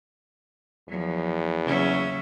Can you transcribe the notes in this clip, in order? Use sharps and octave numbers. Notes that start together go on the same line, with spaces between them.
E2 F3 F#3
C#3 F#3 A#3 C#4 E5